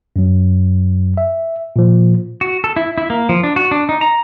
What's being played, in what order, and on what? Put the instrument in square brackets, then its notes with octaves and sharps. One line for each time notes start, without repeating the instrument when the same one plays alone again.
[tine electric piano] F#2 F#3
E5
A#2 F3
[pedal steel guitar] F#4
A4
E4
E4
A#3
F3
D4
F#4
D4
D#4
A#5